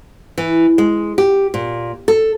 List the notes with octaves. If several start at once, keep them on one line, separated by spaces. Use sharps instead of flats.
E3
G#3
G4
A#2
A4